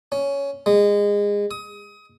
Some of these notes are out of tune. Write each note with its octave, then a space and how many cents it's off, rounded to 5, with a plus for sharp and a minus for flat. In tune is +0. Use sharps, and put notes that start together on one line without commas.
C#4 +10
G#3 -25
D#6 +25